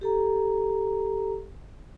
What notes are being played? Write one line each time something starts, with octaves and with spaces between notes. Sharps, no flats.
G4 A4 A#5